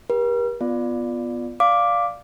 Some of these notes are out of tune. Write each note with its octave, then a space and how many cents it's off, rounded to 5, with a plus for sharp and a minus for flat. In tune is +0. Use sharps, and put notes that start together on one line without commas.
G4 +15 A#4 +45
B3 +0 F4 -5 D5 +10
D5 +0 F5 +0 D6 +0